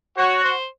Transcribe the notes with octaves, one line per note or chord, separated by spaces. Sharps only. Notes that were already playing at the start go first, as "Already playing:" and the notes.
F#4 C#5
C5